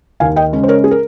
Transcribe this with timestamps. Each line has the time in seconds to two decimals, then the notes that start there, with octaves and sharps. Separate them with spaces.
0.20 D#2 F5 G#5
0.36 D#5 G5
0.53 C#3 G#3 C#4
0.63 C5
0.68 A#4 C#5
0.84 G#4
0.91 A#4